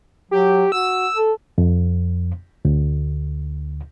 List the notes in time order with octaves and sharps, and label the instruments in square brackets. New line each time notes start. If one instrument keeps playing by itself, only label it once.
[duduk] F#3 [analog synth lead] G4
[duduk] F#4 [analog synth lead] E6
[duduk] A4
[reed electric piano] F2
D2